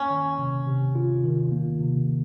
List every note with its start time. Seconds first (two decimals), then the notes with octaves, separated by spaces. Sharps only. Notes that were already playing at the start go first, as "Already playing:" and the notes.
Already playing: A#3 C#4
0.10 D#3
0.38 C3
0.67 C3
0.95 F4
1.24 D#3
1.52 A#3
1.80 C3
2.08 C3